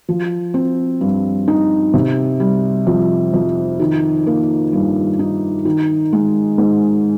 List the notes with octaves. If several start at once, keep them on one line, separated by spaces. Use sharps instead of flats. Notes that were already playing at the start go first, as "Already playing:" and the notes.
F3
C4
G2
D#4
C3
G3
F2
F2
D#3
A#3
G2
D#4
D#3
G#3
G#2